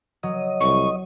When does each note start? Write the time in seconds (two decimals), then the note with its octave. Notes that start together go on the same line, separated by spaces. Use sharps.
0.23 F#3 D#5
0.61 C2 C#6